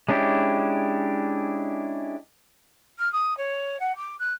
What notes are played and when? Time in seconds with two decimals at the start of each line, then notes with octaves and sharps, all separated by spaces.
0.09 G#3 C#4 D4 E4 G4
2.98 F6
3.12 D#6
3.37 C#5
3.80 F#5
3.96 D6
4.19 F#6